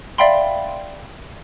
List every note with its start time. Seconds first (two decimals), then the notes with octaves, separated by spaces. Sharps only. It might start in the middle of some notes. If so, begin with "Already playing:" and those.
0.18 D5 E5 F5 G5 B5 C6